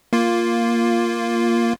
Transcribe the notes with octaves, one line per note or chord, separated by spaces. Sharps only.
A#3 F4